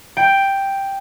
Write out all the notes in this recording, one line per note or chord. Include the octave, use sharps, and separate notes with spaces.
G5